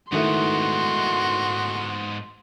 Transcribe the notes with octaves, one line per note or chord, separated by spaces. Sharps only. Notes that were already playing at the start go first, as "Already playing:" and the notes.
G#2 D#3 A3 B3 E4 F#4 C6